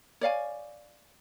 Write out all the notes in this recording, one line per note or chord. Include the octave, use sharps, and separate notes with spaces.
C#5 D5 F5 G#5